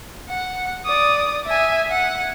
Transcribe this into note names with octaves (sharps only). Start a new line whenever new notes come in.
F#5
D5 D#6
E5 G#5
F#5